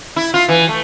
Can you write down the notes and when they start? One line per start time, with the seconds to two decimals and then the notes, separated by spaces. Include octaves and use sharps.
0.16 E4
0.34 F4
0.49 E3
0.69 A3